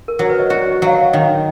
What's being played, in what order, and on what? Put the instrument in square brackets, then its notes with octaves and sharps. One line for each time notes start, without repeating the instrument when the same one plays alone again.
[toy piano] A#4
[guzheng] F#3
[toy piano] B4
D#5
[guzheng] F#4 [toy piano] D5
[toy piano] D#5
[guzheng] F#3 [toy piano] F5
[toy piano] F#5
[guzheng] D#3 [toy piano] D#5